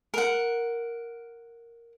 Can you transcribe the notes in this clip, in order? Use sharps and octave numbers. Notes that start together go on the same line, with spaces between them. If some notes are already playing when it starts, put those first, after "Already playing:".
A#4 F#5